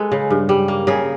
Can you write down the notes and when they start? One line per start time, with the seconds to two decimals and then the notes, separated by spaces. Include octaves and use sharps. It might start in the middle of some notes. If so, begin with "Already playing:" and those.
Already playing: G#3 A4 B4
0.12 C#3
0.30 G2
0.49 G3
0.68 A#3
0.87 C#3 G#4 A#4